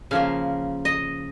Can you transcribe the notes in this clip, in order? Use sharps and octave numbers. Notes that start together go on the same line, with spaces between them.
C#3 F3 A#3 F5
D#5